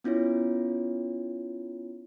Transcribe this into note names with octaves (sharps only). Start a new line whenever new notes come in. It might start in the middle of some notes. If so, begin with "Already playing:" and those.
B3 C#4 E4 F4 C#5